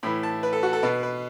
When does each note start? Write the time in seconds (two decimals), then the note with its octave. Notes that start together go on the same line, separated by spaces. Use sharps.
0.03 A2 E3 B5
0.23 A5
0.43 B4
0.53 A4
0.63 F#4
0.73 A4
0.83 B2 B4
1.03 B4